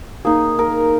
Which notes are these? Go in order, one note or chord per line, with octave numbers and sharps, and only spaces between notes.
A#3 D#4 G#4
A#4